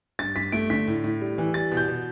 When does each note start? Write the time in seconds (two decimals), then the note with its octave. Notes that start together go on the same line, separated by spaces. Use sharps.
0.19 G2 A6
0.36 G2 B6
0.52 A3 D7
0.70 D3 B6
0.87 A2
1.04 A2
1.21 G3
1.38 E3
1.54 G3 A6
1.71 B2
1.77 G6
1.88 B2